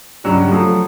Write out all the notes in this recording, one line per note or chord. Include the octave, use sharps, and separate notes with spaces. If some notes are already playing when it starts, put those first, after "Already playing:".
C#2 G2 F#3 G3
F3 F#3 A3